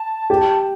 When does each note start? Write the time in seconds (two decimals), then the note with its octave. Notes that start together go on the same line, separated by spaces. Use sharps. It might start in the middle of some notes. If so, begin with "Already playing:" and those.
Already playing: A5
0.30 G4